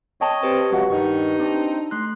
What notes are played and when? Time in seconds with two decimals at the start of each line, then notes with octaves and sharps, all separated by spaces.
0.21 C#5 D#5 G5 A5
0.43 C4 G4 B4
0.72 C3 F3 F#3 G#3 F#4 F#5
0.90 G2 D#3 D#4 C#6
1.40 C4 D4
1.91 A3 C6 F#6